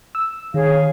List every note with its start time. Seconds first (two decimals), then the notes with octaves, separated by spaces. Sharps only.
0.15 E6
0.54 D#3 G#4 C#5 F5